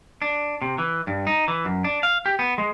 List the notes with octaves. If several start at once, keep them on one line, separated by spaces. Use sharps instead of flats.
D4
C3
E3
G2
D#4
E3
F#2
D4
F5
G4
B3
G#3